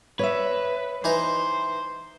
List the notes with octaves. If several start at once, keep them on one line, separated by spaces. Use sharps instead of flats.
B4 C#5 D#5 E5
E3 D#4 C5 A#5